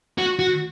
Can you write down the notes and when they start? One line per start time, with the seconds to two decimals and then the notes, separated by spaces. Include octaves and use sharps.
0.18 F#4
0.39 F#4